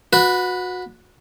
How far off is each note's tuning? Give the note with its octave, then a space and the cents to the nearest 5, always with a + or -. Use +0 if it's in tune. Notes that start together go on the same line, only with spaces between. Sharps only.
F#4 -25 B4 +0